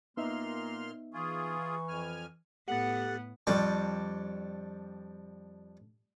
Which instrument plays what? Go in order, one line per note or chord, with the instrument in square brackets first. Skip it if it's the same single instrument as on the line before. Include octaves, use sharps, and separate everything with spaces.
[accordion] A#2 C6 F6 [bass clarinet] A#3 [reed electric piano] B3 D#4 E5
[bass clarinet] E3 [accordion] F4 G#4 [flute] C#6
[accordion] F2 G#5 F6
[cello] A2 B3 [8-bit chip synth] G4 A4 A6 [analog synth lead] F#5
[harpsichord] F2 G3 D4 C#6